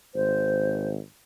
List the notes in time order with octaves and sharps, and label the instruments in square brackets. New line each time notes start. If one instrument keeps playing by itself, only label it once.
[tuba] G#1 [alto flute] C5